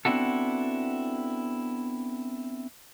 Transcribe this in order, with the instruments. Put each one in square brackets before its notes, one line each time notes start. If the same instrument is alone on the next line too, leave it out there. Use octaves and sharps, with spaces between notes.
[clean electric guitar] B3 C4 D4 E4 F#4 A4